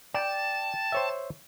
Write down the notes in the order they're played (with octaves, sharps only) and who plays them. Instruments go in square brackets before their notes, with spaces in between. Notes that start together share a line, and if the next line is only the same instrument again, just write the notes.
[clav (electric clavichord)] D5 [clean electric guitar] G5 [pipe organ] A5 A6
[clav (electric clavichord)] C5 C#5 E5